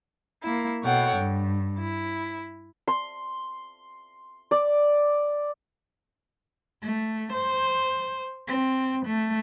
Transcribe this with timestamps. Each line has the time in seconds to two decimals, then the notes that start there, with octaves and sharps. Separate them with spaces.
0.42 A#3 E4
0.83 B2 A4 C#5 F#5 G5
1.15 G2
1.76 E4
2.88 C6
4.51 D5
6.82 A3
7.32 C5
8.48 C4
9.06 A3